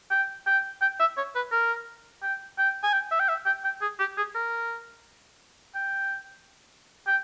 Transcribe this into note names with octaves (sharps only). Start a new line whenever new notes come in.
G5
G5
G5
E5
C#5
B4
A#4
G5
G5
G#5
G5
E5
G5
E5
G5
G5
G#4
G4
G#4
A#4
G5
G5